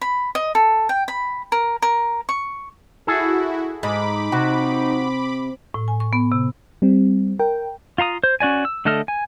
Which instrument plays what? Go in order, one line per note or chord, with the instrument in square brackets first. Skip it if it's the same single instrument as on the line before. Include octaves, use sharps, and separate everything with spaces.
[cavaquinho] B5
D#5
A4
G5
B5
A#4
A#4
C#6
[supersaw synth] E4 F#4 [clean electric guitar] G#4 A4
[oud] G#2 [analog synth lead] D#4 [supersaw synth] B5 D6
[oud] C3 [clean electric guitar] F#4
[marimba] A2
G#5
C#6
B3
C3
[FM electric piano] G3 C4
A#4 G5
[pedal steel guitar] F4 F5 A#5 D#6
C5
C#4 F#4 D5 G#5
E6
D3 A3 A4 D#5 F6
G#5